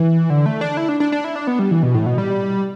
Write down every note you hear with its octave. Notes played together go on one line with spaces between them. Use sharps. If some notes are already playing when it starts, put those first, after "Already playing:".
Already playing: E3
D3
A3
D4
E4
D4
D4
D4
E4
D4
B3
G3
E3
B2
A2
B2
G3